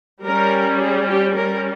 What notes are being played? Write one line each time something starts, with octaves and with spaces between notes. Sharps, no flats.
G3 C#4 A#4
G#4
G4
G3 C#4 A#4